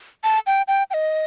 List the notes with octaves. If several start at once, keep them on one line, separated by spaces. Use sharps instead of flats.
A5
G5
G5
G5
D#5